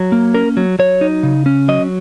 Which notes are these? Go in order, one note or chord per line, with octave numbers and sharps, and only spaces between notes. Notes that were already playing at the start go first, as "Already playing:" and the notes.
Already playing: F#3
A#3
C#4 A#4
F#3
F#3 C#5
D#4
C#3
C#4
F#3 D#5